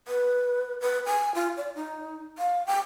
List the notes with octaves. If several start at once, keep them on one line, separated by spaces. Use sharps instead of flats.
B4
B4
G#5
F4
D5
D#4
F5
G5